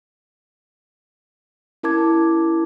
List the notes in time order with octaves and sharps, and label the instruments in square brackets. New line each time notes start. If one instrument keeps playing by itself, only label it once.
[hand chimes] C#4 E4 A#4 A5 D6 G#6